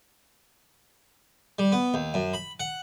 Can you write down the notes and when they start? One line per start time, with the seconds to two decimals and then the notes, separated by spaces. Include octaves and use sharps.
1.59 G3
1.72 B3
1.94 D#2
2.14 F#2
2.34 B5
2.60 F#5